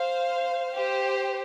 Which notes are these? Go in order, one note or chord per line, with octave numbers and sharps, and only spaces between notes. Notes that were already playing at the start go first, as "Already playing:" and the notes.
Already playing: C5 F5
G4 C5